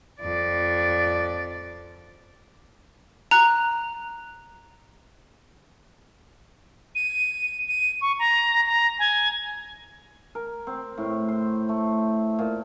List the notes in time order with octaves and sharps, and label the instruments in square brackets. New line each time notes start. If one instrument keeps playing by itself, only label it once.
[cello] F2 D5
[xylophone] A#5 F#6
[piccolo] D#7
D#7
C#6
A#5
A#5
G#5
[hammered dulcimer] A#4
C4
A2
C5
A3
A#2